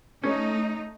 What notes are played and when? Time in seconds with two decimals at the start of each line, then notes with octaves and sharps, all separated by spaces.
0.23 A3 C#4 D#4